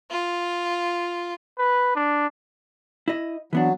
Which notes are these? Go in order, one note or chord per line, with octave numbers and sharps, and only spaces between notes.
F4
B4
D4
E4 D#5
E3 F#3 B3 D4